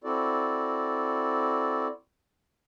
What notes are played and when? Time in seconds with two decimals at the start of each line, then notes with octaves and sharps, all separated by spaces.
0.04 C4 E4 F#4 A4 D5